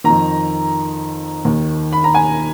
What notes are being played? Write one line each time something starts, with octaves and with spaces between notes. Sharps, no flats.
F2 D#3 A#5
D#2 D#3
B5
A#5
G#5